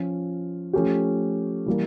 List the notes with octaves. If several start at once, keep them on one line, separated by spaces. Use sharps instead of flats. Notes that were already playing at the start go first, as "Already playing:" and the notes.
Already playing: F3 C#4 F4
F3 A3 C#4 G4
E3 G3 A#3